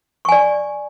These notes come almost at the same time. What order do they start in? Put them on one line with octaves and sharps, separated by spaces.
C#6 G#5 D5